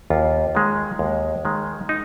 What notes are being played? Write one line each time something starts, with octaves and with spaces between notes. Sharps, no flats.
D#2 F4
D#3 G#3
D#2
D#3 G#3
D#4